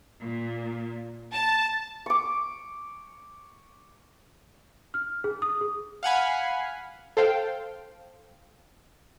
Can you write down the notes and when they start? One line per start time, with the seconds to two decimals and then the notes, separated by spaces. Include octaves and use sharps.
0.23 A#2
1.32 A5
2.06 C#6 D6
4.94 F6
5.24 G#4
5.42 D#6
5.61 G#4
6.03 F5 F#5 G#5 B5
7.17 A4 C5 F5 G5